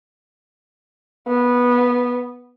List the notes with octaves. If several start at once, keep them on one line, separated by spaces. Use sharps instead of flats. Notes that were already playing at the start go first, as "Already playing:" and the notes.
B3